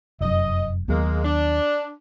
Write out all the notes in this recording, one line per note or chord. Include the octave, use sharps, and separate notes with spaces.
F1 F#2 D#5
D#2 F#3 G#3 A#3 B3
D4